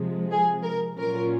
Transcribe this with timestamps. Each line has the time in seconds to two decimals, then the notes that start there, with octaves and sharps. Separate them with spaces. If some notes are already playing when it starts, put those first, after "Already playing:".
Already playing: C3 F3 G#3
0.31 G#4
0.63 A#4
0.96 A#2 F#3 C#4 F4 A#4